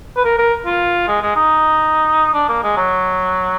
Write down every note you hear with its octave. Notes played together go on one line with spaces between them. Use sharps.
B4
A#4
A#4
F4
G#3
G#3
D#4
D4
A#3
G#3
F#3